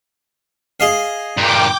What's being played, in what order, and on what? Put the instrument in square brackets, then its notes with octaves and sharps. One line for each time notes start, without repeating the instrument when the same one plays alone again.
[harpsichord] G#4 D#5 F5
[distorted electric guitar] G2 A#2 [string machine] G5 D6